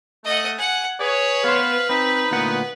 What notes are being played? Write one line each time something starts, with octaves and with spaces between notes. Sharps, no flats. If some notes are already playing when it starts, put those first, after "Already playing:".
A3 D#5 F#5
F#5 G#5
G#4 B4 C#5
B3 C5 F5
C4 D#4 B5
D2 A#2 B3 F#5